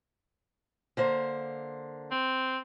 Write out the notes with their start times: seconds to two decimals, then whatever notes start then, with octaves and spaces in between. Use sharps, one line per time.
0.97 D3 A#3 C5
2.11 C4